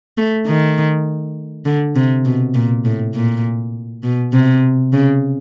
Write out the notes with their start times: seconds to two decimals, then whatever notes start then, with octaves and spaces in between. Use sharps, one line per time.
0.18 A3
0.47 D#3
1.66 D3
1.96 C3
2.25 B2
2.55 A#2
2.85 A2
3.15 A#2
4.03 B2
4.33 C3
4.93 C#3